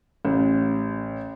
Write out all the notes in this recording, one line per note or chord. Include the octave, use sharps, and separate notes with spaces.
A1